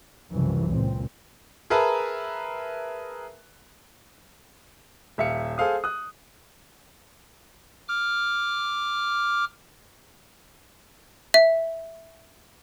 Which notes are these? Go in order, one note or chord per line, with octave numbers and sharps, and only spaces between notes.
C2 F#2 C#3 E3 F3
C#2 A#2 C4
G#4 A#4 B4 E5 A5 A#5
D#1 E5 F5 C#7
G#4 A4 C5 F5 D#6
D#6 F#6
D6 F6
E5